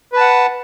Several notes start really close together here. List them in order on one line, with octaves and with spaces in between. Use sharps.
B4 A5 F#5